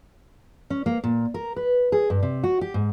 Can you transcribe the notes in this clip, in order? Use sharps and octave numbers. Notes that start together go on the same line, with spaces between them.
C#4
A#3
A#2
A#4
B4
G#4
G2
C3
F#4
G4
G#2